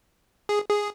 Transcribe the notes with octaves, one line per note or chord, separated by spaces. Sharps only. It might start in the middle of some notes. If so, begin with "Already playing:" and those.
G#4
G#4